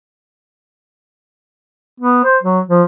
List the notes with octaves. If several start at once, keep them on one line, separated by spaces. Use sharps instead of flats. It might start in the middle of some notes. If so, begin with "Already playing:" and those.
B3
C5
F#3
F3